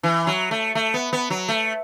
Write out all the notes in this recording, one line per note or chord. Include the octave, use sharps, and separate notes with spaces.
E3
F#3
A3
A3
B3
B3
F#3
A3